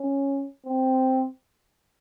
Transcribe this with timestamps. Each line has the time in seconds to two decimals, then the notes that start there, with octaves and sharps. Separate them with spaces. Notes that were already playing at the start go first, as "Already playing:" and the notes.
Already playing: C#4
0.66 C4